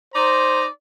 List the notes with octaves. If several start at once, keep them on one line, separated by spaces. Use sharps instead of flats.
D#4 C5 D5 A#5